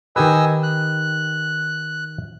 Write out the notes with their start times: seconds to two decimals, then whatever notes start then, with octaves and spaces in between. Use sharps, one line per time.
0.16 D#3 G4 B4 D#5 G#5 E6
0.63 F#6